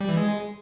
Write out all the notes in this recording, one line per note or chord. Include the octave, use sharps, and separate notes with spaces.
G3
E3
G#3